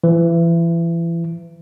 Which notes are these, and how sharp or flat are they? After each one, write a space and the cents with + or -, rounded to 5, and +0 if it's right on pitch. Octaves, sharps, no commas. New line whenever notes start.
E3 +30